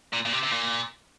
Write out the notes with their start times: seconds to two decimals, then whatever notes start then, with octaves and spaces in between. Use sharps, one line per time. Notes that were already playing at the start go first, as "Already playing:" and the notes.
0.13 A#2
0.26 A#2
0.33 C3
0.43 C3
0.51 A#2